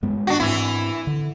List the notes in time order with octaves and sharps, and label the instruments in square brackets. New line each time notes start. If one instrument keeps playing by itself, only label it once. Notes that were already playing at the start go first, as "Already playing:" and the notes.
[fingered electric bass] G2 G#3 B3
[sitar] D4 F#4
[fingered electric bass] G#2 C4 [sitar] E3 E4
[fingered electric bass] D3